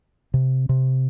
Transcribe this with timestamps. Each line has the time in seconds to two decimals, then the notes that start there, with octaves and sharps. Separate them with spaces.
0.34 C3
0.69 C3